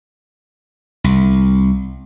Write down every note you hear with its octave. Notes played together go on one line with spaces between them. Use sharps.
C2